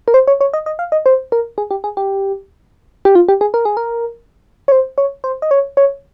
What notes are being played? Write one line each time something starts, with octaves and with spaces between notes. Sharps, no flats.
A#4
C5
C#5
C#5
D#5
D#5
F5
D#5
C5
A#4
G#4
G4
G#4
G4
G4
F4
G4
G#4
A#4
G#4
A#4
C#5
C5
C#5
C5
D#5
C#5
C#5